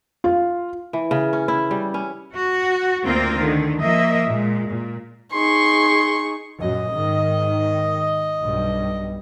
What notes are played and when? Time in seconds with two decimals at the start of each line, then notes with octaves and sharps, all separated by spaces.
0.24 F4
0.93 E3
1.11 C#3
1.33 C#4
1.48 E4
1.71 G3
1.94 C#4
2.34 F#4
3.04 D2 A#3 C4 F4 A#4 C5
3.39 D3 D#3
3.81 F3 A#3 D#5 E5
4.27 A#2 G#3
4.66 A#2
5.33 D#4 G#4 C6 C#6
6.61 F#2 A#2 D#5
6.92 G#2 D#3
8.42 B1 G2 G3